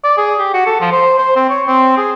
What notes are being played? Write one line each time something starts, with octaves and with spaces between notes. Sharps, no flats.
D5
G#4
G4
F#4
A4
F3
C5
C5
C4
C#5
C4
G#4